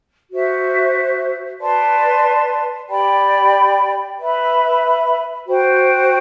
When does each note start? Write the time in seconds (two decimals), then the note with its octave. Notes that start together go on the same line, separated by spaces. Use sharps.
0.30 F#4 C5 E5
1.60 B4 D5 A5 C6
2.89 G4 D5 G5 B5
4.18 B4 E5 B5
5.47 F#4 C5 G5